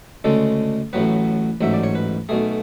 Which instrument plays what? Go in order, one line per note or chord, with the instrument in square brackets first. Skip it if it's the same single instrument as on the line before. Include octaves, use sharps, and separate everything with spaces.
[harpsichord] D2 C#3 G#3 A4
A1 A2 F#3 B3 B4
A1 G#2 F#3 E5
D5
C#5
B4
B1 B2 A3 G#4